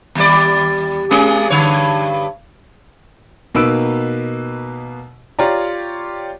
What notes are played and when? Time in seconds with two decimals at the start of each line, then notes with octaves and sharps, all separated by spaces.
0.15 D#2 G3 D5
1.11 G#3 C#4 G#4
1.50 G2 D3 C#5
3.55 B2 A#3 D#4 B4 E6 D7
5.39 F4 G4 C#5 D5 A#5